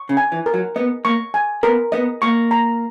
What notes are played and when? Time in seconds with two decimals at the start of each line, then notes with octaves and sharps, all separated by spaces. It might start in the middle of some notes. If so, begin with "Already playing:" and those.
Already playing: C#6
0.09 C#3
0.17 G#5
0.32 E3
0.46 A#4
0.54 F#3
0.76 B3 D#5
1.05 A#3 C#6
1.34 G#5
1.63 B3 A#4
1.92 B3 D#5
2.22 A#3 C#6
2.51 A#5